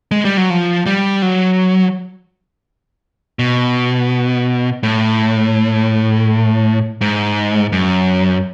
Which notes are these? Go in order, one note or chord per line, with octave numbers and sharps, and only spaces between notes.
G#3
G3
F#3
F3
G3
F#3
B2
A2
G#2
F#2